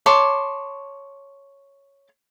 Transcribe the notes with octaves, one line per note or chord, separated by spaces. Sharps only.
C#5 A5 C6 D6